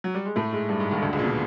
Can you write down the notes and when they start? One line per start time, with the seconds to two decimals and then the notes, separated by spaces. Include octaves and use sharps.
0.04 F#3
0.15 G3
0.25 G#3
0.36 A2 A3
0.52 G#2 G#3
0.69 G2 G3
0.80 G#2 G#3
0.91 D#2 D#3
1.02 D2 D3
1.13 C#2 C#3
1.19 A#2
1.24 B2